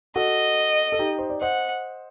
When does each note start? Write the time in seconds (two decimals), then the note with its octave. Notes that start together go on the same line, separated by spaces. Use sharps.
0.16 F#4 A4 D#5
0.92 A4
0.99 D#4 G4
1.19 C5
1.30 D5
1.41 C5 D#5 F#5